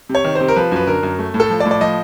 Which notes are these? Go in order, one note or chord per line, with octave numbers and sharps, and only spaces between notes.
C3
C#5
D#3
C5
C3
A#4
F3 B4
F#2 B4
D3 A#4
F#2
A3
A2
A4
F3
D5
A2
D5
F3 D#5